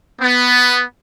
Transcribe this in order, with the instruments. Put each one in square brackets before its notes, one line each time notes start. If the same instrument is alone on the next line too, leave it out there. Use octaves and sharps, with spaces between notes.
[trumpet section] B3